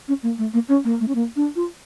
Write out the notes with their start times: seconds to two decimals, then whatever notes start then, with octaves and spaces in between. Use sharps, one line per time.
0.08 C#4
0.23 A#3
0.38 A3
0.54 A#3
0.69 C#4
0.84 A#3
1.00 A3
1.08 C#4
1.15 A#3
1.36 D4
1.56 F4